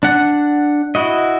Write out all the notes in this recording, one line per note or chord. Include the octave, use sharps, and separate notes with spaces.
D4 F#5
E4 F#4 D#5